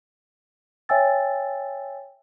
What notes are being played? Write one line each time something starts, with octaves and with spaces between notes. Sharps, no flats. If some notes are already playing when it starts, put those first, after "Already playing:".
C#5 E5 G5 G#5 E6 A6